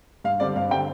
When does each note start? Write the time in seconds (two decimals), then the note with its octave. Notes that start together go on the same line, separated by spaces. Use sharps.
0.24 G2 F5
0.40 D3 G3 C4 D5
0.56 G2 F5
0.71 D3 G3 C4 G5